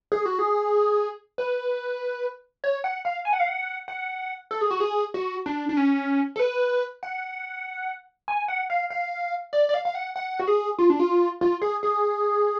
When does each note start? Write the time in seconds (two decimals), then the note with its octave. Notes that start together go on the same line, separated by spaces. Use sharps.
0.12 G#4
0.26 F#4
0.39 G#4
1.38 B4
2.64 C#5
2.84 F#5
3.05 F5
3.25 G#5
3.33 F#5
3.40 F5
3.47 F#5
3.88 F#5
4.51 A4
4.61 G#4
4.71 F#4
4.80 G#4
5.14 F#4
5.46 D4
5.69 D4
5.77 C#4
6.36 A4
6.39 B4
7.03 F#5
8.28 G#5
8.48 F#5
8.70 F5
8.90 F5
9.53 D5
9.69 D5
9.74 F5
9.85 F5
9.95 F#5
10.16 F#5
10.40 F#4
10.47 G#4
10.79 F4
10.90 D4
10.99 F4
11.41 F4
11.62 G#4
11.83 G#4